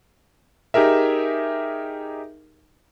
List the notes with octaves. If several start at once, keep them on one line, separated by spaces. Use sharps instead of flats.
D#4 G4 G#4 A#4 E5